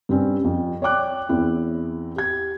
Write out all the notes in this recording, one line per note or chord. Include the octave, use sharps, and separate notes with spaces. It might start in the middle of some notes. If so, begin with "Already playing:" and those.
G2 G3 C4 C#4
F2
C#5 D5 G5 D6 F#6
E2 C4 E4
G4 G#6